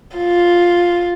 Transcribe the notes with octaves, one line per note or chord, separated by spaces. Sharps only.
F4